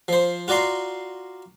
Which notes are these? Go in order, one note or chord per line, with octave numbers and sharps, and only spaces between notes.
F3 C5
F4 F#4 D5 A#5 C6